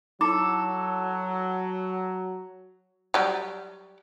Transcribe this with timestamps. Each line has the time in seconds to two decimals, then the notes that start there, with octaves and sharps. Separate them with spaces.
0.21 F#3 E4 A4 D6
3.14 F#3 G3 G4